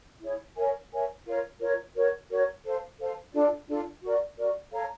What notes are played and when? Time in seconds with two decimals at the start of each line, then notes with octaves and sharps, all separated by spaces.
0.22 E4 G#4 C#5
0.56 A#4 C#5 E5 G#5
0.92 A#4 C#5 E5 G#5
1.26 F4 A#4 C#5
1.60 F4 A#4 C#5
1.95 F#4 A#4 C#5
2.29 F#4 A#4 C#5
2.65 A4 C5 F5
2.99 A4 C5 F5
3.33 D4 F4 A4 D5
3.68 D4 F4 A4 D5
4.02 F#4 A#4 D5
4.37 F#4 A#4 D5
4.72 A4 C#5 F5 A#5